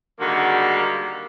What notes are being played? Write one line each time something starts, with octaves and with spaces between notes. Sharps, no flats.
D3 D#3 G3 G#3 A#3 F#4